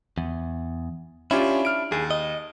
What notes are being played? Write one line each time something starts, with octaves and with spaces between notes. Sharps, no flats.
E2
C#4 D4 E4 F4 G4
F6 D7
D#2 G#4
D#5